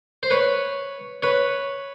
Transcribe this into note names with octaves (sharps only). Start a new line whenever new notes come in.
C5
B4 C#5
B4 C#5